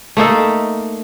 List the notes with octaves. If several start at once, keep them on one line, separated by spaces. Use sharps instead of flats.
A3 A#3 D#4 A4